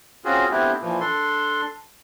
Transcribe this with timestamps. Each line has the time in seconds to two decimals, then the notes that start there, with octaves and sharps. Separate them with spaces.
0.25 C4 C#4 F4 F#4 G#4
0.51 A3 B3 C4 D4 E4 G4
0.81 A#2 E3 F3
1.00 D4 A4 C6